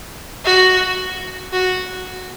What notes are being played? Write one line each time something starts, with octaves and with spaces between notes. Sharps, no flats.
F#4
F#4